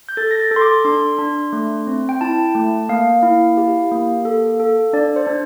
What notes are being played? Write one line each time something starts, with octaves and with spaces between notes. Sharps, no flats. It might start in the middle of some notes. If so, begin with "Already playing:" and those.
G6
A4 A6
A#6
A6
A4
C6
D6
D4 C6
D4
A3
C4
G5
E4 A5
A3
A#3 F5
E4
G4
A#3
A4
A4
D4 D5
C5
D4